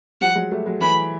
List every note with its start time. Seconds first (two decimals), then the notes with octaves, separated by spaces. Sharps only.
0.21 F3 G3 F#5
0.35 F#3 G#3
0.51 G3 A3
0.66 F#3 G#3
0.81 E3 F#3 B5